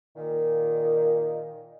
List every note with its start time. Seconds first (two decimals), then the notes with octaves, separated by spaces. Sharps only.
0.16 A#2 D#3